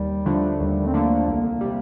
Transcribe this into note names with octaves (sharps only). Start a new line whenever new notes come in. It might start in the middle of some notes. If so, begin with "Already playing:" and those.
Already playing: D#2 G3
D3 F3 A3 D4
D#2 G3
C4
D3 F3 A3 A#3 D4
C2 A#3
C3 G3